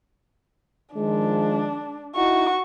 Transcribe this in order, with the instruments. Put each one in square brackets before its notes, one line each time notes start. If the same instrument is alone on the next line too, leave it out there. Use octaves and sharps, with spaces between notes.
[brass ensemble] D#3 F3 G#3 [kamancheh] D4
[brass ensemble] D#4 E4 [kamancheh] F#4 C#6